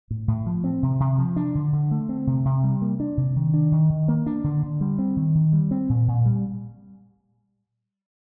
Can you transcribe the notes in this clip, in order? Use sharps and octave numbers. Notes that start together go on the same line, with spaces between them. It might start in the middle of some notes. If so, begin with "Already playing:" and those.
A2
A2
F3
C4
C3
C3
F3
D4
D3
D3
A3
C4
C3
C3
G3
A#3
D4
C3
D#3
D4
D#3
D#3
A#3
D4
D3
D3
G3
C4
D#3
D#3
G3
C4
A#2
A#2
G3